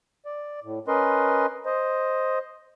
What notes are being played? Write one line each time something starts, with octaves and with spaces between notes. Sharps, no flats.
D5
A2
C#4 A#4 B4 D#5 C6
C5 D#5